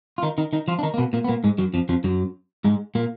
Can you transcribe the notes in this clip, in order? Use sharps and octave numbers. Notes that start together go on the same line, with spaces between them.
F4
D#3 D#4
D#3 D#4
D#3 D#4
F3 F4
D4
D#3 D#4
A#3
B2 B3
A#2 A#3
B3
A#2 A#3
G#2 G#3
F#2 F#3
F2 F3
F2 F3
F#2 F#3
G#2 G#3
A#2 A#3